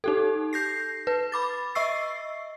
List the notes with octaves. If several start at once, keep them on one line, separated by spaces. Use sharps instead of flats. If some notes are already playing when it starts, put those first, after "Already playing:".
D#4 G4 A4
G6 A#6 C7
B4
B5 D6 A6
D#5 E5 C#6 E6 C7